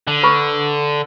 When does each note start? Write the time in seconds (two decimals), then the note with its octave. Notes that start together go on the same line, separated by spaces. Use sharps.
0.08 D3
0.23 B4 B5 C#6